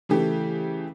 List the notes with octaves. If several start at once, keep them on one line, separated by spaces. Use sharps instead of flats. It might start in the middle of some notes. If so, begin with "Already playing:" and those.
C#3 E3 A3 G4